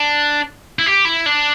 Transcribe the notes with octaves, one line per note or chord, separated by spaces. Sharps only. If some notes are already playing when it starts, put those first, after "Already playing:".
Already playing: D4
E4
G4
E4
D4